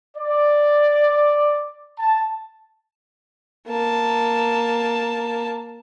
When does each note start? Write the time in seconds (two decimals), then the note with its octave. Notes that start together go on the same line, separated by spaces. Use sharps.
0.17 D5
1.99 A5
3.67 A#3 A5